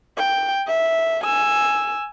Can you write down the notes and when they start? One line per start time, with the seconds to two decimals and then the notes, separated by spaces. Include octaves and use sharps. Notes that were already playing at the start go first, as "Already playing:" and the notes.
0.18 G5
0.67 E5
1.24 G#5 E6